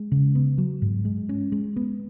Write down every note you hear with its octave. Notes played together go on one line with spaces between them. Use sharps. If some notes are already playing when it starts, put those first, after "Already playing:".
Already playing: G#3
C#3
B3
F#3
G#2
G#3
C#4
G#3
B3